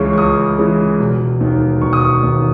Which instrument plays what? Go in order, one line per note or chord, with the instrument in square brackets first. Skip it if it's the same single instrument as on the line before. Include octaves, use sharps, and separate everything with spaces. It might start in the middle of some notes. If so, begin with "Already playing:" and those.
Already playing: [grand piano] C#2 C#3 E3 G#3 C#6
C#6
C#2 D#6
C#3 E3 G#3
E1
D#2 D#3
E1 C#6
D#6
C#6
D#2 D#3